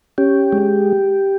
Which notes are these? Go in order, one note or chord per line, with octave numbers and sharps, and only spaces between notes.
C#4 G4
G#3